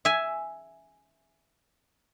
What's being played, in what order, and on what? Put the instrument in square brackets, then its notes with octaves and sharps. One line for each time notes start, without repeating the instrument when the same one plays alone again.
[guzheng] E5 G#5